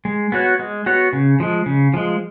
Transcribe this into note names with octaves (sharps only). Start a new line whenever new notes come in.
G#3
B3 F#4 C#5
G#3
B3 F#4 C#5
C#3
F3 G#3
C#3
F3 G#3